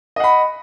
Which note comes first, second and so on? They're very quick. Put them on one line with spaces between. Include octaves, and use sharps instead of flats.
D#5 F#5 B5